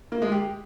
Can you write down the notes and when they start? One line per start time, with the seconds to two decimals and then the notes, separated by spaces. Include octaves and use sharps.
0.12 A#3
0.22 G#3
0.32 G4